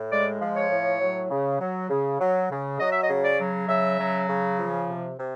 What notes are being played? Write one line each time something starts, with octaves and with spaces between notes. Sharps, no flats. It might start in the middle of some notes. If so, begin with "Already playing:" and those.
Already playing: A2
G#3 D5
F3
C#5
A2
F#3
C#3
F#3
C#3
F#3
C#3
F#3 D#5
E5
D#5
C#3
D5
F#3
C#3 E5
F#3
C#3
F3
C3
C3